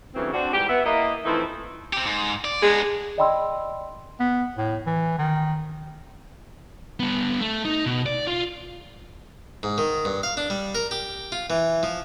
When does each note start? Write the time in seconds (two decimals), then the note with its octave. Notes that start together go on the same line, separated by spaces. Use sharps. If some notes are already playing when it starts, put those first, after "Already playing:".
0.14 D2 C#3 E3 F#3 G3 C4
0.33 C4 D4 F#4
0.53 G#2 E3 G3 G4
0.68 B3 E5
0.85 A#3 E4 D#5
1.25 E3 F3 A3 C4 D#4 E4
1.93 C4 G4
2.06 G#2
2.45 D5
2.62 G#3 B3 D4
3.18 D5 D#5 G5 B5 C6 E6
4.20 B3
4.57 A2
4.86 E3
5.18 D#3
7.00 G3 B3
7.41 A3
7.65 D#4
7.86 B2
8.06 D5
8.27 F4
9.63 G#2
9.78 D#3
10.05 G2
10.23 F5
10.37 D4
10.50 G3
10.75 A#4
10.91 G4
11.32 F4
11.50 E3
11.83 F3